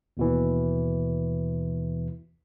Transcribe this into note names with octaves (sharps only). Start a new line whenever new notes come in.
D#2 B2 E3